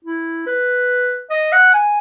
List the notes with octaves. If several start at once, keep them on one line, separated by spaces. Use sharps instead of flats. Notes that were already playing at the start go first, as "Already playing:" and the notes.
E4
B4
D#5
F#5
G#5